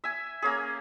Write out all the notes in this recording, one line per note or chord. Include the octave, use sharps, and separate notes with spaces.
E5 G#5
A#3 C#4 G#4